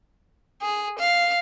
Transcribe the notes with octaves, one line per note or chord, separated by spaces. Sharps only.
G#4
F5